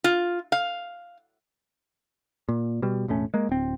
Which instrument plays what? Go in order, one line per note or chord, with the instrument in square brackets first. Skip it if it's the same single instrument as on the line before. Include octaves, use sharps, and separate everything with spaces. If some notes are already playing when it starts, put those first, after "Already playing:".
[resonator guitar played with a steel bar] F4
F5
[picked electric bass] A#2
B2 G3
E1 A2 A3 C#4
G#3 A#3
D1 C4